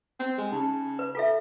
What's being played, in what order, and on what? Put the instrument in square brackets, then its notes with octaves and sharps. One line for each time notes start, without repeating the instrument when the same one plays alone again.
[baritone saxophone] C4
G#3
[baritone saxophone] C#3 [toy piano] D#4
[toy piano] B4
F4 A4 E5